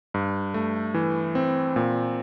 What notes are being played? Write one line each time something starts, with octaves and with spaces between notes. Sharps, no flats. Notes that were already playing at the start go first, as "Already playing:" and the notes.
G2
A3
E3
C4
A#2